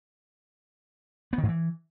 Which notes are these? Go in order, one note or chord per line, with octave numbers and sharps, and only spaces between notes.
B3
D#3
G#2
E3